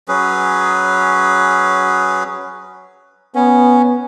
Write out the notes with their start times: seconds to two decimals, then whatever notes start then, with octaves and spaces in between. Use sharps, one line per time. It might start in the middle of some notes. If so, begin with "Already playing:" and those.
0.08 F#3 C#4 G#4 B4
3.35 B3 C#4